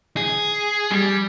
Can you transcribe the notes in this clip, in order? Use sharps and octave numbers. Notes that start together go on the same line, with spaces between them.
G#4
G3